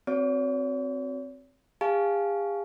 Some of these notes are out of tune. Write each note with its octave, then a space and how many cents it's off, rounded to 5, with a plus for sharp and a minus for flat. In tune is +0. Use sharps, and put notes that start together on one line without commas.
C4 +0 F#4 +0 C#5 +45
G#4 -45 F5 +0 A5 -40